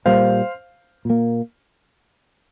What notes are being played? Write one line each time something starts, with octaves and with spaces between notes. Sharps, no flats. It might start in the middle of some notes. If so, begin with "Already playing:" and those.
A#2 G3 A#3 C5 F5
A#2 A#3